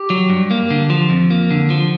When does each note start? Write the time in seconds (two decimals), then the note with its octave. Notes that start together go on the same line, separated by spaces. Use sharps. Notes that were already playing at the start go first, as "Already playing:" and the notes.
Already playing: G4
0.10 F#3
0.30 G2
0.51 A#3
0.70 D3
0.90 F3
1.10 F2
1.30 A#3
1.51 D3
1.70 F3